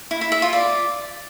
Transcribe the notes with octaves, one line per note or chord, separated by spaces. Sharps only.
E4
E4
E5
F4
D5